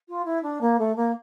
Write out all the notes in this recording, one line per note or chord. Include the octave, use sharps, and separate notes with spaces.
F4
E4
D4
A#3
A3
A#3